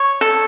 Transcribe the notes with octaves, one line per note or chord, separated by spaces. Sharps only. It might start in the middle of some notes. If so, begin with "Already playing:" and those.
Already playing: C#5
A4